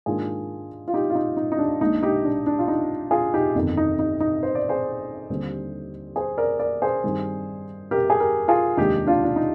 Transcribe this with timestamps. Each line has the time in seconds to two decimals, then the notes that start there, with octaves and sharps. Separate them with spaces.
0.06 G#2 D#3 A#3 D4 F4 G#4
0.88 F4
0.94 D#4 G4
1.10 F4
1.15 D#4
1.37 D#4
1.52 D#4
1.59 D4
1.81 A#1 A#2 G#3 D4 D#4
2.03 D#4 G4
2.24 D4
2.47 D4
2.59 F4
2.68 D#4
3.11 F4 G#4
3.34 D#4 G4
3.55 G1 F2 D#3
3.77 D#4
3.99 D#4
4.20 D#4
4.43 C5
4.55 D5
4.69 G#4 C5
5.29 D#2 D3 G3 C4
6.16 G#4 C5
6.38 A#4 D5
6.59 A#4 D5
6.82 G#4 C5
7.03 G2 D#3 G3 C4
7.91 G4 A#4
8.10 G#4
8.20 G4 A#4
8.48 F4 G#4
8.77 F1 D#2 D#3 G#3 D4 D#4 G4
9.07 D4 F4
9.24 D4
9.36 D#4